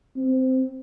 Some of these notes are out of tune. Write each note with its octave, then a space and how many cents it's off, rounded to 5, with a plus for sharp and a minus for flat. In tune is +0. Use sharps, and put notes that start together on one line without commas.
C4 -10